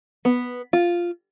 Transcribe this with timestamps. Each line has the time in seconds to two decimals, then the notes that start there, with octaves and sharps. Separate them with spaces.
0.25 B3
0.73 F4